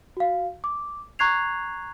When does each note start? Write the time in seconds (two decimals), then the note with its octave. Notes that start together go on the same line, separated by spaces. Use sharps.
0.17 F#4 F5
0.64 D6
1.19 A#5 C#6 F#6 G#6 C7 F7